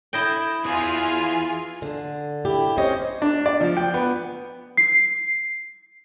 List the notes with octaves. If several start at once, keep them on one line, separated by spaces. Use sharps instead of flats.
E4 D#5 G5
E3 F4 G#4 G#5
D3
E4 G4
C4 C#4 C5 C#5 D#5
D4
D5
F3
G5
B3
C7